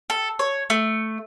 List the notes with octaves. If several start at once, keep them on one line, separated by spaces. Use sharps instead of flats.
A4
C#5
A3